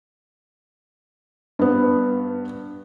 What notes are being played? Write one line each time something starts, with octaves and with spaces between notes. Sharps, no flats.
G2 B3